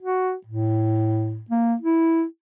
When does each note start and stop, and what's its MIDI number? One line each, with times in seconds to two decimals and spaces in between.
0.02 0.34 66
0.46 1.43 45
1.50 1.76 58
1.82 2.24 64